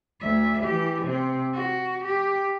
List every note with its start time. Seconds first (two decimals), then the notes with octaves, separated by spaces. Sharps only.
0.20 D2 E5
0.63 E3 G4
1.05 C3 C4
1.53 F#4
2.05 G4